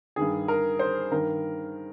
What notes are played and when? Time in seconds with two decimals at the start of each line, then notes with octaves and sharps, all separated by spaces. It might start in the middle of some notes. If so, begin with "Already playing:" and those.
0.16 G2 D#3 G#4
0.48 A#4
0.79 C5
1.11 G2 D#3 A#4